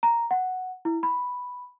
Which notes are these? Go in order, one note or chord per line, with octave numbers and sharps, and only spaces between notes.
A#5
F#5
E4
B5